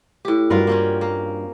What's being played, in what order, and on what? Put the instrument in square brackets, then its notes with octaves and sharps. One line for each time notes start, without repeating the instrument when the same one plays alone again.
[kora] A2 G4
[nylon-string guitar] G2 F#4 [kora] F4 A#4 B4
[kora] A#3 C4 C#4
A#3